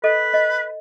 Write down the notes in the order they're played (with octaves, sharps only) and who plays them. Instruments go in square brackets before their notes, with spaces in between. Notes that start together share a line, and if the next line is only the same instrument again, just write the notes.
[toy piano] A4 D#5 [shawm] B4
[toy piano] D#5